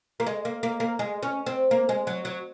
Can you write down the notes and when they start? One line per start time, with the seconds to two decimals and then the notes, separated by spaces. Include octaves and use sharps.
0.20 A#3
0.27 G#3
0.45 A#3
0.63 A#3
0.80 A#3
0.99 G#3
1.23 C#4
1.46 C4
1.71 A#3
1.89 G#3
2.07 F#3
2.25 F#3